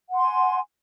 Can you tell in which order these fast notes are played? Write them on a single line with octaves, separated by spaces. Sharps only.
F#5 C6 G#5